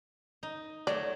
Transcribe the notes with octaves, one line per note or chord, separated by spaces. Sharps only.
D#4
F#3 A3 D5